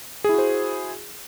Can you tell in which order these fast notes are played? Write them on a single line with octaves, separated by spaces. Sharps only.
G#4 E4 F#4 C5